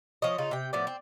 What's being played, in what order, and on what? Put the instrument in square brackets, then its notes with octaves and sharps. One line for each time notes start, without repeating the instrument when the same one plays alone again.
[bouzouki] F3 C#5 D#5
C#3 D#4 F4
C3 G5
A2 F3 B3 D5
C4